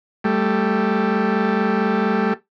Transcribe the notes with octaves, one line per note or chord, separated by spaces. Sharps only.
G3 A3